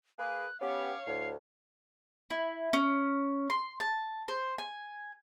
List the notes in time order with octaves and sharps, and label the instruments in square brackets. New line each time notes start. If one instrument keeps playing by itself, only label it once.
[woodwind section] A#3 G#4 B4 [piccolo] F#6
[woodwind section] B3 G4 [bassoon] C#4 [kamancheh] C#5 F5 [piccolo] D6
[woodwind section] D2 [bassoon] A2 [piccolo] C7
[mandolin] E4
C#4
C6
A5
C5
G#5